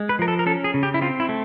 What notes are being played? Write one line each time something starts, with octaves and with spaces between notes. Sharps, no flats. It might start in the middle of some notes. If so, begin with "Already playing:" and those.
Already playing: G#3
B4
F3 A#4
A4
A#4
C#4 A4
G#4
C#3
G4
E4
C4 F4
E4
A3